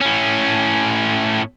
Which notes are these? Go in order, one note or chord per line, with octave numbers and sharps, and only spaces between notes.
A2 C#4